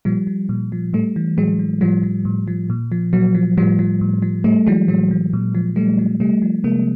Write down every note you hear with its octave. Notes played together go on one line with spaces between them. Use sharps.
A#2 F3 G3
F3
A#2
F3
A2 G3 A3
E3
A2 F#3 G#3
E3
A2 F3 G3
F3
A2
F3
A#2
F3
A#2 F#3
F3
A2 F3 G3
F3
A2
F3
A2 G3 A3
E3 F#3 G#3
A2 F#3 G#3
E3
A#2
F3
A#2 G3 A3
F3
C3 G3 A3
F3
C3 G#3 A#3